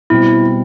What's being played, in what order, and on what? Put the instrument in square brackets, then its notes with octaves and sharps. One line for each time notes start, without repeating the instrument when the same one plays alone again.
[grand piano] B2 G3 C4 [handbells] E4